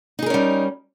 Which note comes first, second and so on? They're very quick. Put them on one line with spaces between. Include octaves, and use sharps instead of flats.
D#4 G#4 A#4 C#4 G3